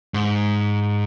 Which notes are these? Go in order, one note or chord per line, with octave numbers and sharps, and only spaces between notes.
G#2